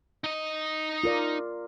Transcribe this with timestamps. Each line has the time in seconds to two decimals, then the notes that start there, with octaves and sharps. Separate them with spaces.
0.24 D#4 D#5
1.04 F4 A#4 D5